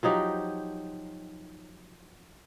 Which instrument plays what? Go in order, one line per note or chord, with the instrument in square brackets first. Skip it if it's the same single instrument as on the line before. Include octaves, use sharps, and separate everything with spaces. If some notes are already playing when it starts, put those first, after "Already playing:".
[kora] F3 F#3 D#4 G4